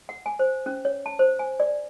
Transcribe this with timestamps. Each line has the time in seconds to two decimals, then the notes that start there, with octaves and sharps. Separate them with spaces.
0.09 F#5
0.26 G#5
0.39 C5
0.66 C#4
0.85 C#5
1.06 A5
1.19 C5
1.39 G#5
1.60 D5